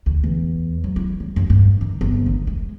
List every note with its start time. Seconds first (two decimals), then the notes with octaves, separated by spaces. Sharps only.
0.06 D2
0.24 E2
0.84 F#3
0.96 E4
1.20 G3
1.36 F#2
1.50 G2
1.81 D#3
2.01 G1
2.26 D#3
2.47 G#3